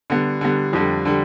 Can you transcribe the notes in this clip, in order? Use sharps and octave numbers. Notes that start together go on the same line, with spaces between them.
D3 G3 B3
D3 G3 B3
F2 D3 G3
D3 G3